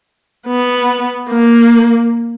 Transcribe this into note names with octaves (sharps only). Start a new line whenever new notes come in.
B3
A#3